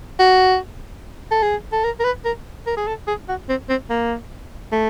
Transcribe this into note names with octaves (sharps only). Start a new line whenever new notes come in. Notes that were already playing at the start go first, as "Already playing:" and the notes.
F#4
A4
G#4
A4
A#4
A#4
B4
A#4
A#4
G#4
A4
G#4
F#4
C4
C4
A#3
A3